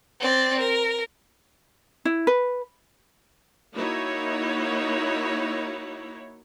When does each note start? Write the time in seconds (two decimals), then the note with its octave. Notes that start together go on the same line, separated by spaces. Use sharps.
0.20 C4 D5
0.60 A#4
2.05 E4
2.27 B4
3.73 A#3 D#4 E4 F#4 C#5